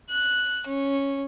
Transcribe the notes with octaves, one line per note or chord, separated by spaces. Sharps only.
F#6
C#4